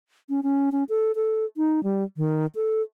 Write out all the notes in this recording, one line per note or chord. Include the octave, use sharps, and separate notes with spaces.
C#4
C#4
C#4
A4
A4
D#4
G3
D#3
A4